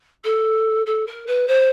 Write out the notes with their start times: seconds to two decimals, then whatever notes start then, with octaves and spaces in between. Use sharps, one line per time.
0.24 A4
0.86 A4
1.06 A#4
1.27 B4
1.48 C5